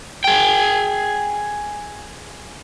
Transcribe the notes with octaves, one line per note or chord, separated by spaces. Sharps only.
G#4 G5